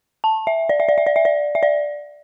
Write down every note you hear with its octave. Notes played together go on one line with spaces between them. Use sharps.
A5
E5
D5
E5
D5
E5
D5
E5
D5
E5
D5